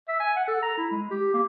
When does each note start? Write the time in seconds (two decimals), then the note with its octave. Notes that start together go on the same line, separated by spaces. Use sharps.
0.08 E5
0.20 G#5
0.36 F#5
0.48 A4
0.62 A#5
0.77 E4
0.91 G#3
1.11 G4
1.34 A#3